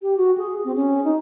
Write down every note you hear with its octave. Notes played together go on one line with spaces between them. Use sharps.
G4
F#4
G#4
C4
C#4
D#4